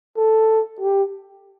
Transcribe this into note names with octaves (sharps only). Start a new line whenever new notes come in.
A4
G4